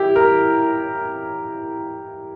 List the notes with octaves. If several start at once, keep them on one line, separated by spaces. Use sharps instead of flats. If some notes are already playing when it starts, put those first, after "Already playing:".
Already playing: E4 G4
A#4